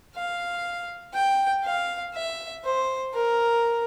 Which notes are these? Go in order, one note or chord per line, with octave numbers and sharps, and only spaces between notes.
F5
G5
F5
E5
C5
A#4